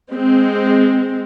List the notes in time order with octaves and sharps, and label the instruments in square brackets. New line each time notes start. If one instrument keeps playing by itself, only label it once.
[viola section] G#3 C4